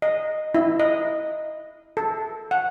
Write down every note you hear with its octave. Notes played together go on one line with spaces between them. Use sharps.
D#5
E4
D#5
A4
F#5